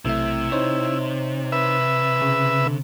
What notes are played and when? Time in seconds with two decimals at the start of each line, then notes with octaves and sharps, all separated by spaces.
0.05 B1 C3 A3 E4 E5
0.52 D#4 C5 C#5
1.52 B4 E5
2.22 C#3
2.66 D3